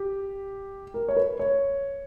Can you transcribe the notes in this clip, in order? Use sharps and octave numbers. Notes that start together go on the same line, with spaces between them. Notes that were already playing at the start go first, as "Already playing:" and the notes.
Already playing: G4
A#4
C#5
B4
C#5